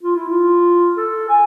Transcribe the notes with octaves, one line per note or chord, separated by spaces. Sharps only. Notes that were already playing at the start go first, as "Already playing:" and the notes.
F4
E4
F4
A4
G#5